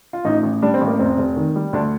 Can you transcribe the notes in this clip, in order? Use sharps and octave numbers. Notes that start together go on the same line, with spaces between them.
F4
A1 D#4
A1
G3 D4
C4
A1
A#3
F1 C4
F1
D#3
G3
D2 D4